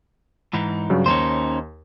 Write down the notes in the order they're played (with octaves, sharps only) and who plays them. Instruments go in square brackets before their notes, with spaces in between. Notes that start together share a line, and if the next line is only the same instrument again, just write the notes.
[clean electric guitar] G#2 E3 D#4
[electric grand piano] G2 C#3 F#3
[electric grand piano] D#2 [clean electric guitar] C#4 D#4 C5